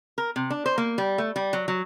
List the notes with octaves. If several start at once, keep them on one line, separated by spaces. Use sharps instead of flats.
A#4
C3
D4
C5
A#3
G3
A3
G3
F#3
F#3